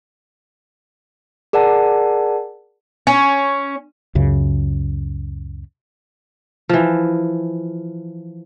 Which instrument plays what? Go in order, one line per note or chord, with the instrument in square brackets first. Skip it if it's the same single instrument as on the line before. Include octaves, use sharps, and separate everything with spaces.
[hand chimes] G#4 A#4 D5 F#5 A5
[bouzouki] C#4
[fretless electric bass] C#2 F#2 C#3
[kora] E3 F3